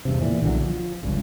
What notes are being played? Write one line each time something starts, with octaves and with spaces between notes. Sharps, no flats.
E2 G2 C3
A#2 E3
B1 D3 E3 F#3
F3
G1 C#2 G2 C#3